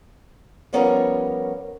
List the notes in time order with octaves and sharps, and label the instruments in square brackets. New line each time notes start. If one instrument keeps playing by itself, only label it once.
[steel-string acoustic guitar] F3 G3 B3 C#4 A#4 C#5